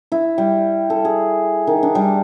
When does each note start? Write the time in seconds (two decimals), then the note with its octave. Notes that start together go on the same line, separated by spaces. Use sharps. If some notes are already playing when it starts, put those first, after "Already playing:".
0.12 E4
0.38 G3
0.90 A4
1.05 G#4
1.67 D#3
1.83 D4
1.95 G3